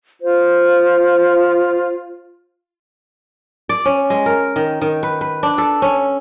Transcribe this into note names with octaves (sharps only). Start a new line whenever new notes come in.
F4 C5
D5
C#4
G#3
A#4
D#3
D#3
B4
B4
D4
A4
C#4